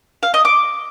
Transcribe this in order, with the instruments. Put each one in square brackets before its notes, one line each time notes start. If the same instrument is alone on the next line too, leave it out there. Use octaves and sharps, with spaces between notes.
[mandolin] F5
D#5
D6